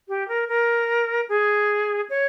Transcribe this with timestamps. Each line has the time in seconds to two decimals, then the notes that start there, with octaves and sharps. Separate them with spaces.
0.08 G4
0.28 A#4
0.48 A#4
1.29 G#4
2.09 C#5